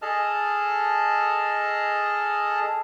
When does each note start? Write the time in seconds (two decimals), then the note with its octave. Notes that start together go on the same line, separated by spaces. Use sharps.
0.02 G#4 A4 D#5 A5 F6